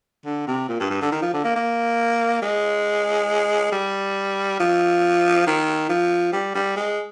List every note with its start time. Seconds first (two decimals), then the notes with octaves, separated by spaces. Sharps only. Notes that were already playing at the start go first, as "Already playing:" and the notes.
0.25 D3
0.47 C3
0.69 A#2
0.80 G2
0.90 G2
1.01 D3
1.12 D#3
1.22 F3
1.34 D3
1.44 A#3
1.55 A#3
2.42 G#3
3.72 G3
4.60 F3
5.47 D#3
5.89 F3
6.33 G3
6.55 G3
6.76 G#3